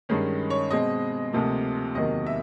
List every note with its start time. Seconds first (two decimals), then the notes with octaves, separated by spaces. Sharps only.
0.09 G2 D#3 G#3 C#4
0.50 C#5
0.71 B2 G#3 C4 D#5
1.33 D2 C3 F3 A#3
1.95 E2 C3 D#3 F#3 A#3 D#5
2.27 E5